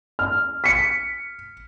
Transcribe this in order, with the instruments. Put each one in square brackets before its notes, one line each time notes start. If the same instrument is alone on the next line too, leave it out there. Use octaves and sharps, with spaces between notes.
[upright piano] F6
[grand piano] B6 C#7